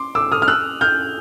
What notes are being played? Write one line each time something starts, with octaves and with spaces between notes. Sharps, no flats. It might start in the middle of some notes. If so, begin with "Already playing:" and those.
Already playing: C6 D6
D6 E6
D#6 F6
F6
E6 F#6
F6 G6